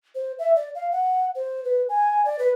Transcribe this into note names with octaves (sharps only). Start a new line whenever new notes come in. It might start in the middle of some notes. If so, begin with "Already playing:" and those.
C5
E5
D5
F5
F#5
C5
B4
G#5
D5
B4